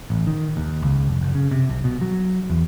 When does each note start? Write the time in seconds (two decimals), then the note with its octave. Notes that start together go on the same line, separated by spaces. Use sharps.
0.10 A1
0.27 D#3
0.57 D#2
0.82 C#2
1.08 F1
1.21 F#1
1.35 C#3
1.51 C3
1.69 B1
1.84 B2
2.01 F#3
2.50 E2